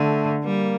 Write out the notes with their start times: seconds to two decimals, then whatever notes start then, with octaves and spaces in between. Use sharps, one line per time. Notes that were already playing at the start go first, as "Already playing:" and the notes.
Already playing: D3 A3
0.45 G3 A#3